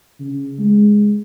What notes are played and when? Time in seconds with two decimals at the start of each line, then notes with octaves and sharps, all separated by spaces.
0.20 C#3
0.59 G#3